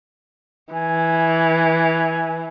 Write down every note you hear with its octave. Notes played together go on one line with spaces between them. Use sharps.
E3 G#5